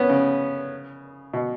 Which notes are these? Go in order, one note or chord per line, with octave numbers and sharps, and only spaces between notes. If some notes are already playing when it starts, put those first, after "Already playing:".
Already playing: B3 C#4
C#3
B2